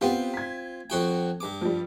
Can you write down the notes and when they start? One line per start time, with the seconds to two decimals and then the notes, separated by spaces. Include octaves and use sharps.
0.01 B3 C4 F4 G4
0.34 G#6 B6
0.90 F2 F#4 G5
1.40 G2 D6
1.61 F3 G3